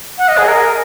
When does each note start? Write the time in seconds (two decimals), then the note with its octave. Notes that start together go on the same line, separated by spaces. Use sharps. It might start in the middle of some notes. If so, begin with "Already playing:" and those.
0.18 F#5
0.28 D#5
0.37 G#4
0.48 A#4